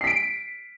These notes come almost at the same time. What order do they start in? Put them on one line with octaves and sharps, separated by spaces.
C7 B6 D7